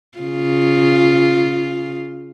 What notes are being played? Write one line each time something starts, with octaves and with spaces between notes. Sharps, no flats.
C#3 F4